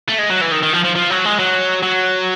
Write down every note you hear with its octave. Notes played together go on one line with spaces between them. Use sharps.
A3
G#3
F#3
E3
D#3
D#3
F3
F3
F3
F#3
G#3
F#3
F#3